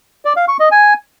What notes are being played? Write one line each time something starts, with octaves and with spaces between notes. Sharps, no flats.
D5
F5
C#6
D#5
G#5